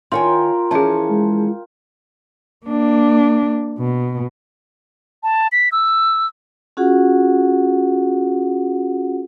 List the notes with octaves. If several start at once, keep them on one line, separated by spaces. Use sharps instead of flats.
D#3 F4 A#4 C#5 G5 G#5 C6
E3 F3 C#4 G#4 A5
G#3
A#3 D4
B2
A5
B6
E6
C#4 F4 F#4 G#4 F#5